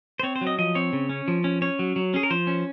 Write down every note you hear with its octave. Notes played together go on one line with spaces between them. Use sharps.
C5
C4 C#5
C5
F#3
D#5
F3 D#5
C4 C#5
C#3
C#4
F3
C#4
C#4 C#5
F#3
F#3
C#4 G#4
A#4
F3 C5
C#4